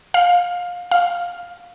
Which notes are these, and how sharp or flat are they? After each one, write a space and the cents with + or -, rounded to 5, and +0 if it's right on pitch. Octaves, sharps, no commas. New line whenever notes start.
F5 +25
F5 +15